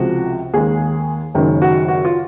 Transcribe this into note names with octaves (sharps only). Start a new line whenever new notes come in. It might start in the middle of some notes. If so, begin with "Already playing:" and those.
Already playing: C#2 C3 F3 G#3 F#4
D#2 D#3 G#3 G#4
F#1 F#2 D#3 G#3
F#4
F#4
F4